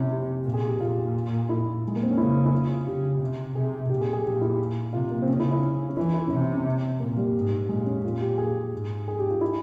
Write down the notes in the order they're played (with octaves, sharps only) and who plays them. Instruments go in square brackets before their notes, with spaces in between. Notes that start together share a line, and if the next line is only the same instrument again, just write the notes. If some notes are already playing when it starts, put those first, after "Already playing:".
Already playing: [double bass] C3 [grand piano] C#4 E4
[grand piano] G4
[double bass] A#2
[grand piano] G#4
G4
[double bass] A#2 [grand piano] F4
[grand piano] E4
G#3
A#3
C4
C#4
[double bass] C#3 [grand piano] E4
[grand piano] E4
F4
[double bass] C#3 [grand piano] G4
[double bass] C3
[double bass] C3 [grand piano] G#4
[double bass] A#2 [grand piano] G4
[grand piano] G#4
G#4
[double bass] A#2 [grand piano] G4
[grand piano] E4
[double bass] C3 [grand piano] F4
[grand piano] A#3
C4
[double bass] C#3 [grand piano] C#4
[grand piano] E4
E4
C#4
C#4
[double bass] E3 [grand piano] E4
[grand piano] E4
[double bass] C3 [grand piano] C#4
[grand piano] C4
C#4
[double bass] A#2 [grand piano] A#3
[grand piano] G3
[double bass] G#2
[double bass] A#2 [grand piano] G#3
[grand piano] C#4
[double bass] A#2 [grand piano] F4
[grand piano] G4
G#4
[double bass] G#2
[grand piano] G#4
G4
F4
E4